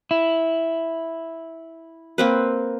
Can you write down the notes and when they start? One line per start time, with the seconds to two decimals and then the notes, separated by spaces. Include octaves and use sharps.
0.11 E4
2.18 A#3 C4 B4